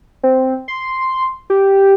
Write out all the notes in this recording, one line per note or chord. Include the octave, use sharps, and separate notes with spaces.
C4
C6
G4